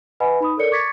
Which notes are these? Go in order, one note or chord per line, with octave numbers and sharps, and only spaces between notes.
B4 D#5 F#5 G#5 B5
D#4 B5 D#6
A4 A#4 C#5 D5 C#7
C#6 D6 G#6 A6 B6 C#7